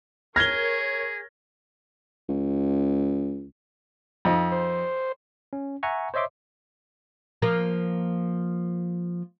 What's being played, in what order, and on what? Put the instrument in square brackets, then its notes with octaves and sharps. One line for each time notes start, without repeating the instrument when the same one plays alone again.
[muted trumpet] G#4 [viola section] A#4 C#5 [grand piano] F6 G7 [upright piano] G#6 A#6
[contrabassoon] C#2
[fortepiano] F2 D#4
[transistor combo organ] C5
[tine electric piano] C#4
E5 F#5 G#5 A#5 C#6
C5 C#5 D#5 E5 C6 D6
[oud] F3 A#3